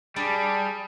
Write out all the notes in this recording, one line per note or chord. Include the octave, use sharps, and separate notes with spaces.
G3 D4 G#4 B5